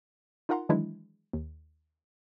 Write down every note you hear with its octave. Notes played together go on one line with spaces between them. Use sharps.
D#4 F4 A#4 F#5 A#5 C6
D#3 E3 F#3 G#3 D4 E4
D#2